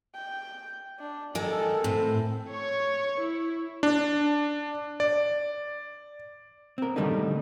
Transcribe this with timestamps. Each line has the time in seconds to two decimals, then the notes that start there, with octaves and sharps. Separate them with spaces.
0.15 G5
0.99 D4
1.35 D#3 G#3 A4
1.84 A2 C4
2.51 C#5 C#6
3.20 E4
3.83 D4
5.00 D5
6.78 C4 A#4
6.96 D3 D#3 G3 A3 D4 D#4